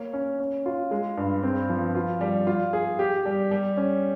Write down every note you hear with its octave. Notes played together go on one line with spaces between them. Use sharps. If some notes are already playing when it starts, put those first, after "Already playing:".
Already playing: A#3 C#5
C#4
C#4
F4
G#3
G2
C4
F3
F4
G3
F4
G#4
G4
G3
G3
C#4